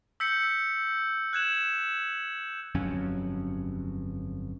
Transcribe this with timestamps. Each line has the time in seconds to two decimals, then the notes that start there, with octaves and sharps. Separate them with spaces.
0.20 E6 G6 B6 C#7
1.33 F#6 G#6 E7 F#7
2.75 G1 F2 F#3 C#4